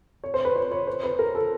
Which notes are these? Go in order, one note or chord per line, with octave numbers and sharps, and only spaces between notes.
C#5
C5
B4
C#5
C#5
C5
B4
A#4
A4